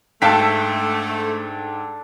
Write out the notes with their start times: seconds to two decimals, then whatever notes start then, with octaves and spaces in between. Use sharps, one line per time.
0.22 G#2 A3 D4 A4 F5 G5 A5 B6